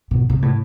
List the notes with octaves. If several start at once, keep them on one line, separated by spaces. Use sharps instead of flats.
B2
C3
A2